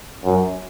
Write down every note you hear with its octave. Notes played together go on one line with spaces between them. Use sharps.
F#2